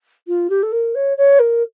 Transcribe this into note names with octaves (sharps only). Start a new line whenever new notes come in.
F4
G4
A4
A#4
C#5
C#5
A#4